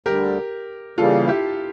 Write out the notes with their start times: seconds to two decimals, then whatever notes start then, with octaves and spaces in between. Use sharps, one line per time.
0.06 D2 D3 G3 G4 A#4
0.98 C#3 E3 G3 A#3 F4 A4
1.28 E4 G4